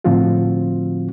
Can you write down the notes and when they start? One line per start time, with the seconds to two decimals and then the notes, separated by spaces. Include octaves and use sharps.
0.04 A2 D3 F3 C4 F4 F#4